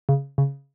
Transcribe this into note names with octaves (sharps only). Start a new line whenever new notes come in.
C#3
C#3